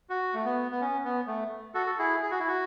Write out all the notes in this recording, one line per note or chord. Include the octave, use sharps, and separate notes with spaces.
F#4
A3
B3
B3
C#4
B3
A3
F#4 A4
A4
E4 G#4
G#4
F#4
E4
F#4